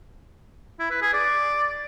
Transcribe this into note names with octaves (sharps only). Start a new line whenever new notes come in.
E4
B4
G#4
D5